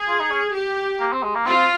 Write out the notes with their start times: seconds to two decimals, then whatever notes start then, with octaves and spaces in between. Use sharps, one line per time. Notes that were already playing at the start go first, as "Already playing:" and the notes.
Already playing: G#4
0.08 F4
0.20 D#4
0.31 C#4
0.55 G4
1.00 A#3
1.13 C4
1.23 G#3
1.35 A#3
1.47 C4 F4